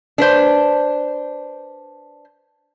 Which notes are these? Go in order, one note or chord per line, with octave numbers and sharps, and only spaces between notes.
D4 B4 C5